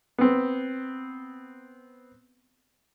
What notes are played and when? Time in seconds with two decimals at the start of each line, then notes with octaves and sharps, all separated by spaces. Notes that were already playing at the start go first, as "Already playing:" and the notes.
0.18 B3 C4